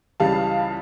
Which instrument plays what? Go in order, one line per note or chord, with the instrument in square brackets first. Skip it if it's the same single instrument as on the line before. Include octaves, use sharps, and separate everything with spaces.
[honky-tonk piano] C#2 C#3 E3 G3 F5 A5